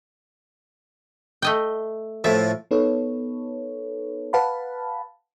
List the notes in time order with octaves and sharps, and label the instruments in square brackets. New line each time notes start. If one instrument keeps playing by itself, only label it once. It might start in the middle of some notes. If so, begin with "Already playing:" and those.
[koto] A3 D#5 G5
[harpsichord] A2 F3 [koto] E5
[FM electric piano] B3 D#4 A4 B4 C#5
B4 F5 F#5 A5 B5